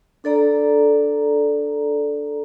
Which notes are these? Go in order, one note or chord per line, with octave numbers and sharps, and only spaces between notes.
D4 A4 D5 A#5